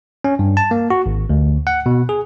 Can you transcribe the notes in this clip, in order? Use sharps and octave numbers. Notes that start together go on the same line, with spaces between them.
C#4
G2
A5
A#3
F#4
G#1
D2
F#5
B2
G#4